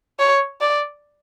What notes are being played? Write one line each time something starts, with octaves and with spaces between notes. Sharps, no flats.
C#5
D5